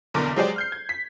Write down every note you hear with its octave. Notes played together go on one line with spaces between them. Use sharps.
F#1 B1 E2 D3 A#4 D6
F#3 G#3 G4 G#4 C5 D5
F6 G6 C7
G#6
B6